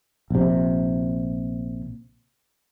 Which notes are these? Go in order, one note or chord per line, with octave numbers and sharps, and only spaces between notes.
A#1 C3